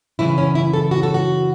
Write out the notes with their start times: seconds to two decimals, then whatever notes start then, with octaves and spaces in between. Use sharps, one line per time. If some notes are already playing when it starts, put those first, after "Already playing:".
0.19 F#2 C#3 E3 E4
0.38 C#4
0.55 E4
0.73 A4
0.91 F#4
1.03 A4
1.14 F#4